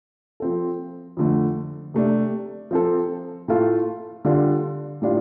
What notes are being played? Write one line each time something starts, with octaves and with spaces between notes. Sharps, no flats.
F3 C4 A4
F2 D3 A3
C3 A3 D4
F3 C4 A4
A2 A3 F4 A4
D3 G3 D4 F4 A4
A2 G3 D4 F4